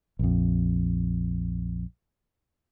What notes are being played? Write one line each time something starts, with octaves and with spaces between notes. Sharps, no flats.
A#1 F2